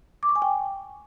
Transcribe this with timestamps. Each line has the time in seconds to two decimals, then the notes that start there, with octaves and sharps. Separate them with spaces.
0.23 D6
0.29 C#6
0.36 G#5
0.42 G5